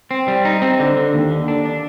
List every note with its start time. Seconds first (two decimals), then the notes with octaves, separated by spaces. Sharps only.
0.11 C4
0.28 G3
0.45 D#4
0.62 C4
0.79 D3
0.97 D3
1.14 D#2
1.31 D3
1.48 D4
1.66 D4